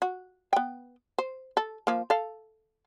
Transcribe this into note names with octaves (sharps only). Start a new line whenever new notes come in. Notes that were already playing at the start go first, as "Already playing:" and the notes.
F#4
B3 G5
C5
A4
F3 A#3
A4 F5